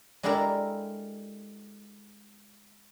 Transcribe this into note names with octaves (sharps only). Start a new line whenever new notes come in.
G#3 D4 E4 G4 A4 A#4